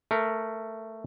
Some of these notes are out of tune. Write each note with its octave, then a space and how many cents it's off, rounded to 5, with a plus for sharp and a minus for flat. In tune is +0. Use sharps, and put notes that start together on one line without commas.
A3 +10 A#4 +0